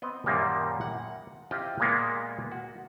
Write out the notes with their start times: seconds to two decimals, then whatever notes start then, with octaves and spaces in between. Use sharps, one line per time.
0.02 B3 C4 D#5
0.26 F#2 A#2 D#3 G3 A#3
0.81 F#5
1.51 E4 F4 G4 C5 D#5
1.80 A#2 G#3 A#3 B3
2.52 F#4